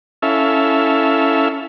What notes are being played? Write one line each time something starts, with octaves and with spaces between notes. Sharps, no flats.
C#4 E4 A4 E5 F5